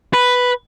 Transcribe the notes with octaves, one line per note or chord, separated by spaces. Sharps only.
B4